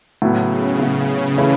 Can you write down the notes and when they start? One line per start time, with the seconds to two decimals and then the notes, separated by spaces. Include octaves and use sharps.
0.22 A2 C#3 F#3 B3
0.80 A2 C#3 F#3 B3
1.09 C#3
1.37 C#3 E3 A3 C#4 E4